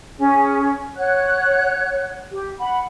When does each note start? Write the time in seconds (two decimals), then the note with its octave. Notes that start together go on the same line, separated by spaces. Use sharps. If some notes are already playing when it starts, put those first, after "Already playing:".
0.18 C#4 G#4
0.96 C#5 F#5 F#6
2.31 G4
2.59 F#5 B5